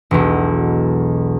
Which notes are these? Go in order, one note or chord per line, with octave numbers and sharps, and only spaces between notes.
E1 B1